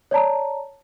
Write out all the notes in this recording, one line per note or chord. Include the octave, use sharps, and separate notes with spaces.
C#5 D5 A5 A#5